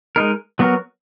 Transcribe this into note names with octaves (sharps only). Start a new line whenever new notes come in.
G#3 D#4 A#4
F#3 B3 F#4 A#4